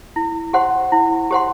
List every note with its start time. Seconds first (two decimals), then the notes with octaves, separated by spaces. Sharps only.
0.16 E4
0.53 G4 C5 F#5 C6
0.92 E4
1.31 G4 C5 F#5 C6